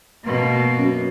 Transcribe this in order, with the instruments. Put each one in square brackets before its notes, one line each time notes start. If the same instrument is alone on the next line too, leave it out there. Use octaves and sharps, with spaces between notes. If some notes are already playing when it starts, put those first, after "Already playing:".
[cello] B2 A#3
[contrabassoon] F#2